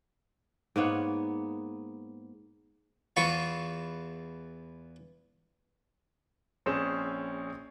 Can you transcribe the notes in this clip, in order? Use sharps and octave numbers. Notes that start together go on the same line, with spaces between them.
G#2 A#3 B3 C#5
E2 E3 F4 B5 C#6
A#1 C4 C#4 G#4 E7